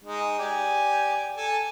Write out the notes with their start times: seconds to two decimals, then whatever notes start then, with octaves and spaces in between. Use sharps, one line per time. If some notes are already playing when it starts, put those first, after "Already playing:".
0.04 G#3 D#4
0.39 G4 D5 G#5
1.37 A4 G#5 A5